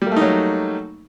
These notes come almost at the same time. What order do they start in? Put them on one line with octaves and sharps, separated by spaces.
G3 A#3 A3 D#4 F#3